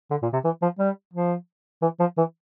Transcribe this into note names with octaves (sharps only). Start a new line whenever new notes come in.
D3
A#2
C3
E3
F3
G3
F3
E3
F3
E3